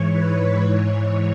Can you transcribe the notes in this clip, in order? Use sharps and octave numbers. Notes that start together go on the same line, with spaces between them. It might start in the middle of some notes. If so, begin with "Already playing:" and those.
Already playing: G#2 E3 C#5
B4
G#2 E3 C#5